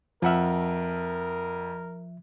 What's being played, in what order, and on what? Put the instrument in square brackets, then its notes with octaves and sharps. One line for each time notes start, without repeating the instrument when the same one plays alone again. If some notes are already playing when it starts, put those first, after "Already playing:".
[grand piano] F2 F#5 F6 [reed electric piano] F3 E5 [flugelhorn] A#4